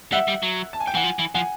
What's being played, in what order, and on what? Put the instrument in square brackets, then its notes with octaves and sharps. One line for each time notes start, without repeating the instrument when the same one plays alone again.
[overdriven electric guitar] G3 [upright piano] E5 F#5
[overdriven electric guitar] G3
F#3
[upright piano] A5
G#5
G5
[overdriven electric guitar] E3 [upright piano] F#5 G#5
[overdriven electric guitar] F3
E3
[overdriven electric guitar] F3 [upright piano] F#5 G#5